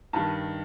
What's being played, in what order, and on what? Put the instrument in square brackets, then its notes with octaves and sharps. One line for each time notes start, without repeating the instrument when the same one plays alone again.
[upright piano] G2 D#3 A5